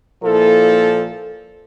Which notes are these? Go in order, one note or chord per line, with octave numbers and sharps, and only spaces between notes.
A#2 F3 A#3 E4 A4